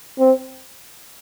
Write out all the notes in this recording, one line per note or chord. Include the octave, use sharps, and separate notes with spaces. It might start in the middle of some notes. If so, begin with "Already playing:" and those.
C4